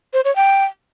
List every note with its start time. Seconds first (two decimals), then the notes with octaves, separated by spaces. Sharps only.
0.13 C5
0.25 C#5
0.36 G5